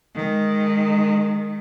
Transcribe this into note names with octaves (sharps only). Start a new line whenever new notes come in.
D#3 G#3